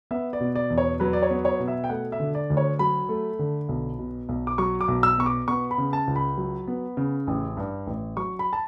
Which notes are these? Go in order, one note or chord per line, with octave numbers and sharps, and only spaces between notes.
B3 E5
D5
B2
D5
E2
C#5
F#3 B4
D5
C#5
B3
C#5
B2
E5
G5
A3 F#5
E5
D3
D5
D2
C#5
F#3 B5
A3
D3
B1
B2
B1
D6
F#3 C#6
D6
B1
E6
B2 C#6
D6
B3 C#6
B5
C#3
A5
C#2
B5
F#3
B3
C#3
A1
G2
A1
F#3 C#6
B5
A5